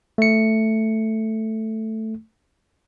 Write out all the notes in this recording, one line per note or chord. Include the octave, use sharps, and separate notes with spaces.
A3 C#7